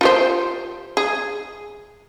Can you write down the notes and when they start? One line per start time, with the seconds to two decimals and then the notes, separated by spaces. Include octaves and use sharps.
0.01 F4 G4 C5
0.97 G#4